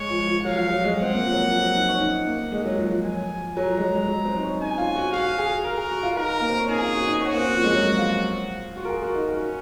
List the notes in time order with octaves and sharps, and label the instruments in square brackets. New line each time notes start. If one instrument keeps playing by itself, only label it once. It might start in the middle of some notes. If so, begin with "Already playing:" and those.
Already playing: [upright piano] G#3 [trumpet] C#5
[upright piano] F3
F3
F3
[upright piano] F#3 [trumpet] F5
[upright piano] F3
F#3
G#3
[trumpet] F#5
[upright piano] C4
A#3
F3
F#3
F3
F#3
D#4
C#4
D#4
A#3
G#3
F#3
F3
F3
[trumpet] G#5
[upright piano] F#3 [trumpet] A#5
[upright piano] F3
G#3
F#3
G#3
F#3
C4
D#4
C#4
[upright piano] D#4 [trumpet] G#5
[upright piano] F4
F#4
[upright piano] F#4 [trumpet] F5
[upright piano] G#4
[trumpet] A#4
[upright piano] G#4
F#4
F4
[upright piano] D#4 [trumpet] A#4
[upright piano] A#3
C4
C#4
[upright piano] D#4 [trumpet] G#4
[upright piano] F4
F#4
D#4
[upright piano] C#4 [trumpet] F#4
[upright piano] A#3
C4
F3
G#3
F#3
F4
[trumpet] F4 [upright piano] F#4
[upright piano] A#4
G#4
F#4
D#4
[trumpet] C#4 [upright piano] F#4